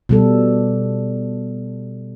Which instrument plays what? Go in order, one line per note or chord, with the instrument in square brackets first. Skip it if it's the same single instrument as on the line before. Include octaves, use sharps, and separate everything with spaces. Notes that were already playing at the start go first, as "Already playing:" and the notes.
[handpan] B2 G3 A4